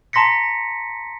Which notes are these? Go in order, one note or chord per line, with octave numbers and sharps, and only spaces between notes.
A5 A#5 C6 A#6 B6 C#7